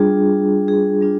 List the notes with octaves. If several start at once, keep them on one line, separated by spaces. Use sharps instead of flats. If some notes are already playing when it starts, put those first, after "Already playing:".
Already playing: G3 D4 F4 G#4
G#4
G3 D4 F4